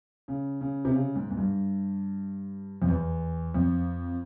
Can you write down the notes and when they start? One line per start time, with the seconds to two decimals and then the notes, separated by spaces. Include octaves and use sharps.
0.28 C#3
0.61 C#3
0.85 C3
0.94 C#3
1.15 G#2
1.31 G#2
1.37 G2
2.82 F2
2.88 E2
3.54 F2